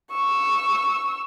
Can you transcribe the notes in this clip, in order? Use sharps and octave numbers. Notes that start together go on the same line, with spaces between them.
C#6 E6